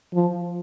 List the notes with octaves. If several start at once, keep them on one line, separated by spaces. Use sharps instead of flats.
F3